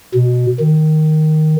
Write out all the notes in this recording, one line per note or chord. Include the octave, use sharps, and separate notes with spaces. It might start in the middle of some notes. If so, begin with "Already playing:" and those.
B2
D#3